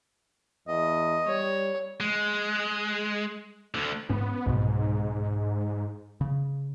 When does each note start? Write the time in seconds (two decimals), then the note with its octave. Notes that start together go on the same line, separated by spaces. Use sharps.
0.68 E2 D#5
1.27 G3 C#5
2.00 G#3
3.75 D2 D3
4.09 G#2 B3 C#4
4.46 C2 G#2 B2
6.21 C#3